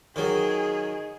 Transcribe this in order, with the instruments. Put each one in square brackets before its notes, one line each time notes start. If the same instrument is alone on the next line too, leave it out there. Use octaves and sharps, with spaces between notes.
[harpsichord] D#3 F#3 [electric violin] G#4